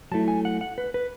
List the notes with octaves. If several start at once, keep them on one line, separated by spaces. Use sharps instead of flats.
F#3 A3 E4 A5
G#5
F#5
F#5
B4
B4